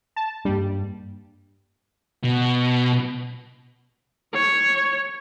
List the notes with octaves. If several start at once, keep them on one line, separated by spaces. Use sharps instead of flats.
A5
G2 G3 A#3 D4
B2
C#5